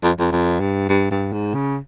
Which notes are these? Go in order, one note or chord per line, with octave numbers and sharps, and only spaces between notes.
F2
F2
F2
G2
G2
G2
G#2
C#3